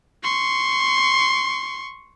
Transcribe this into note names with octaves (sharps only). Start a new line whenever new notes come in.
C6 C#6